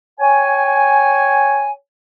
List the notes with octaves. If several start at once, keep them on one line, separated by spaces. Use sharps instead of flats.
C#5 G5 G#5